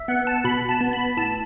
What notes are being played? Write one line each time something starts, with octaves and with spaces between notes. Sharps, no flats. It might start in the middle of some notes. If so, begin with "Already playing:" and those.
Already playing: E5
B3 F#5
A5
B2 B5
A5
B3
B5
A2 A5